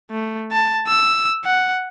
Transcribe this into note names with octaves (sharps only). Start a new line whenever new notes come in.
A3
A5
E6
F#5